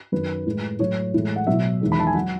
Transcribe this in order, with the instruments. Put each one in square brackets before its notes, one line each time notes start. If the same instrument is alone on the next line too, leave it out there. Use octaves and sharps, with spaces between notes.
[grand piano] F#2 D#3 F#3 B4
A2 G#3
A2 F#3 C#5
A2 E3 G#3
F#5
B2 F#3 E5
E2 D#3 G#3
B5
A5
G#5
F#3 F#5